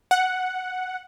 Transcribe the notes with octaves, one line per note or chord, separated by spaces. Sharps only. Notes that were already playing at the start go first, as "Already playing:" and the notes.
F#5